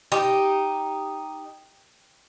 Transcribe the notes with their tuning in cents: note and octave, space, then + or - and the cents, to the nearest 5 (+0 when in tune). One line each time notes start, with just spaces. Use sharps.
D#4 +0 G4 +0